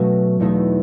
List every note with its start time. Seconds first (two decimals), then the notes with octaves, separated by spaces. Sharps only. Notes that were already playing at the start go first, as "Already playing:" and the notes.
Already playing: B2 F#3 A3 C#4 F#4
0.40 E2 B2 A3 D#4 F#4